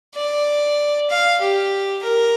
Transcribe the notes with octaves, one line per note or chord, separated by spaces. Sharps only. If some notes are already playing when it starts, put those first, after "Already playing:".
D5
F5
G4
A#4